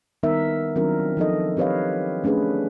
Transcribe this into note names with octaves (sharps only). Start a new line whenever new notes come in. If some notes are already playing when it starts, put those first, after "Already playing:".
D#3 G3 B3 D#4 A#4 E5
D#3 F#3 C4 D4 F4 A#4
F3 D#4 A4 D#5
C4 G4 B4 C#5 D#5 F5
A3 C#4 D4 G#4 B4